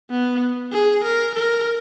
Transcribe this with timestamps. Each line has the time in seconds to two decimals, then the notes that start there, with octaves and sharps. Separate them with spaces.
0.10 B3
0.72 G#4
1.03 A#4
1.35 A#4